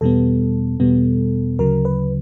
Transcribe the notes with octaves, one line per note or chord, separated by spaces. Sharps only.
E2 B2 G3 B3 A4
E2 B2 G3 B3
D2 C#3 F#3 A#4
B4